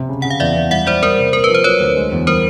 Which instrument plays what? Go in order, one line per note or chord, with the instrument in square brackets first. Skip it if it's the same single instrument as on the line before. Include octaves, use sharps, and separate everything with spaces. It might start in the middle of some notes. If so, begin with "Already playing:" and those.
Already playing: [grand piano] C3
C#3
[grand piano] C#3 [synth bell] F#5
[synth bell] F5
[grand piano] E2 [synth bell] D5 E5
[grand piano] E2
[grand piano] G3 [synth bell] E5 F#5
[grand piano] G3 [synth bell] C5 D5
[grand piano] G3 [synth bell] A#4 C5
[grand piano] C3
[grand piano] A#3 [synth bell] A#4
[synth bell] B4
[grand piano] F3 [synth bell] C5
[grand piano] F#3 [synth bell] B4 C#5
[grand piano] D2
G#3
E2
[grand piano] G3 [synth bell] A#4 C5